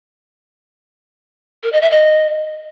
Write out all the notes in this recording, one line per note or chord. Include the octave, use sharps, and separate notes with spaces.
A#4
D#5
E5
D#5